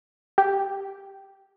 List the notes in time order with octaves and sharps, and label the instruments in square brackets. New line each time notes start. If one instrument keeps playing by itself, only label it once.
[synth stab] G4